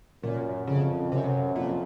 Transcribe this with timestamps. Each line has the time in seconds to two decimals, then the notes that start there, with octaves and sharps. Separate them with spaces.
0.23 F#2 A#2
0.67 F2 C#3
1.11 F#2 C3
1.55 F2 A#2